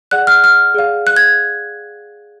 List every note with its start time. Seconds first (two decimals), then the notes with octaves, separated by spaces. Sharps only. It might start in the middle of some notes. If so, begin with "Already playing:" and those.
0.11 G#4 D5 F#5 F#6
0.27 F6
0.44 F6
0.74 G#4 D5 F5
1.07 F#6
1.16 G#6